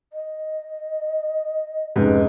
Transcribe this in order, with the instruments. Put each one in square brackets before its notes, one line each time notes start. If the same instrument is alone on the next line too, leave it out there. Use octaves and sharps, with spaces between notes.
[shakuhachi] D#5
[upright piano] F1 G#2 C#3 [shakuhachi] B4